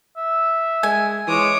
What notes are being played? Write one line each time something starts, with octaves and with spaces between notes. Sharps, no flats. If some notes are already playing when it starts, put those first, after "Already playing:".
E5
G#3 G#5
E3 G#3 C#5 D6 D#6